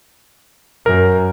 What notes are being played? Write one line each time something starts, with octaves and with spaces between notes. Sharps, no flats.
F#2 A#4